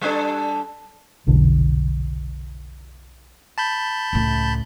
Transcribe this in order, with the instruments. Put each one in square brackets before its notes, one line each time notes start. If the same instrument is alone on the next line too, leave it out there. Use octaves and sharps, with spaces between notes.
[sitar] G3 D4 A4
[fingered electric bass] F1 B1 D3
[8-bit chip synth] A5 B5 G6
[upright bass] C#2 A2